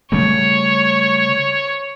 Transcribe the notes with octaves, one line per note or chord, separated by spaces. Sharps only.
C#3 G3 A3 C#5